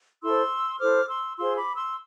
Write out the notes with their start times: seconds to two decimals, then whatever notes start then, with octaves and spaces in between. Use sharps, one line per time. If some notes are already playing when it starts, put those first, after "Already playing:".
0.22 E4 A4 C5 C6 E6
0.80 E4 A4 C5 D6 F6
1.09 C6 E6
1.37 F4 G#4 C5 C6 E6
1.56 B5 D6
1.76 C6 E6